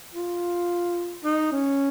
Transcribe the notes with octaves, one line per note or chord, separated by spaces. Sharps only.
F4
D#4
C#4